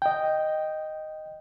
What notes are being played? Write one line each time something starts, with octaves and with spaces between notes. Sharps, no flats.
D#5 G5